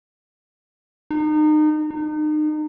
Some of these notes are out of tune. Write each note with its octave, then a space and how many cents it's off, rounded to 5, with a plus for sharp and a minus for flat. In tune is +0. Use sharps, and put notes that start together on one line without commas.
D#4 -30
D#4 -35